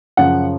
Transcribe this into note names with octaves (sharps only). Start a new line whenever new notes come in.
F#2 C#3 F3 F#5